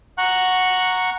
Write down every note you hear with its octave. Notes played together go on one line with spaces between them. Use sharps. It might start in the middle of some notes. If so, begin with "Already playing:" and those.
F#5 A#5 C#6 F#6